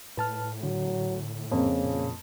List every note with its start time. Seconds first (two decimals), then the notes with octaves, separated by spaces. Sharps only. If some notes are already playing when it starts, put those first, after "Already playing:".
0.17 A2 B4 A5 F6
0.63 D3 F#3
1.51 F2 C#3 A#3
1.84 A#2